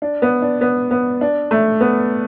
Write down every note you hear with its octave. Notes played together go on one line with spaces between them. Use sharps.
D4
B3
D4
B3
B3
D4
A3
B3